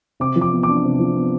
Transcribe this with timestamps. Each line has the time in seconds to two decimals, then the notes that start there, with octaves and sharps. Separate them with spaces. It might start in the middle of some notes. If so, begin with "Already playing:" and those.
0.20 C3 D6
0.36 F3
0.41 D6
0.52 B3
0.63 D6
0.69 D4
0.84 C3
0.99 F3
1.16 B3